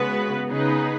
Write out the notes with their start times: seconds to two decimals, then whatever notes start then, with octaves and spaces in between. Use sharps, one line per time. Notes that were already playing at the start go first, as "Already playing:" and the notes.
Already playing: C#3 G#3 B3 F#4 B4
0.47 C#3 B3 D#4 G#4 B4